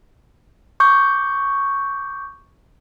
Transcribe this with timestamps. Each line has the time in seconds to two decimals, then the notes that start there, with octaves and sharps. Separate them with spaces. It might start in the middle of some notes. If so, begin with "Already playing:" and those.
0.80 C#6 D6 G6